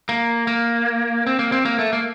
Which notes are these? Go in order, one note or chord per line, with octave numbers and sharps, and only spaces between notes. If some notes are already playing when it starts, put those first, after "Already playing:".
A#3
A#3
C4
A#3
C4
A#3
A3
A#3